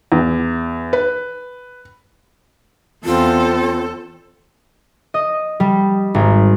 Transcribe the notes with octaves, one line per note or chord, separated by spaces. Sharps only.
E2
B4
E2 C4 F4 A4
D#5
G3
G#1